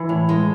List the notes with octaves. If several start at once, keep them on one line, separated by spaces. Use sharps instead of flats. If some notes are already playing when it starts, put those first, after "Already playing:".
Already playing: E3
A2
G#3